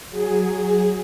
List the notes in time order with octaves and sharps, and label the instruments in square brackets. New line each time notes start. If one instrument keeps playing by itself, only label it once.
[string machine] F#3 G#4